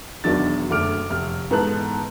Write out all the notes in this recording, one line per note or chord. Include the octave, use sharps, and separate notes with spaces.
E1 E2 D#3 F#3 D4 A6
F#1 D3 A3 D6 F6 D7
F1 F6
G#2 E3 B3 A4 A5 F#6